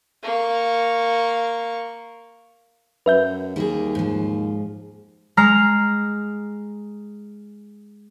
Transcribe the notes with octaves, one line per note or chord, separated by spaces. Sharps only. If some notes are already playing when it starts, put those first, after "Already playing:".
A#3 C#6
F#2 B4 E5 G6
D#2 G3 A#3 G#4
G#2 F3
G#3 A#5 F6 C7